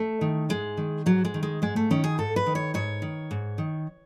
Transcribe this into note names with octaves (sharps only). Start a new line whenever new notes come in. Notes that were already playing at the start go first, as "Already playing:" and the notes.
Already playing: A3
D#3
G#2 G#3
D#3
G#2 F#3
G#3
D#3
G#3
G#2 G#3
A3
D#3 C#4
G#4
G#2 A4
B4
D#3
C#5
G#2 C#5
D#3
G#2
D#3